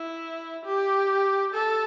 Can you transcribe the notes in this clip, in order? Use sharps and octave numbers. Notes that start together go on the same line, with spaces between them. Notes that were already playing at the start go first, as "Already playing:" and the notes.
Already playing: E4
G4
A4